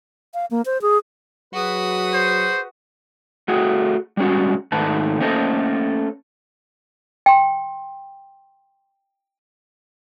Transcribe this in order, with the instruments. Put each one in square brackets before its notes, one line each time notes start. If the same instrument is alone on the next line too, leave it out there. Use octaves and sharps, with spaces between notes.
[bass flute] F5
A#3
C5
G#4
[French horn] F#3 [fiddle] F#4 D#6 [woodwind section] G#4 B4
[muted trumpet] C5
[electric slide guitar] A3 F#4 G#4
G3 G#3 C#4 F#4
G#2 D#3 A3 B4 A5
A3 A#3 C#4 A4 C5 D#5
[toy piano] G5 C6